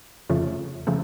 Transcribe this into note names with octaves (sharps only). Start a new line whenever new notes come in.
F2 C#3 F3 A3
C#3 F3 A3